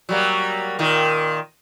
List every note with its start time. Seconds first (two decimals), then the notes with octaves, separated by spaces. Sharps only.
0.09 F#3 G3 A#3
0.79 A#2 D#3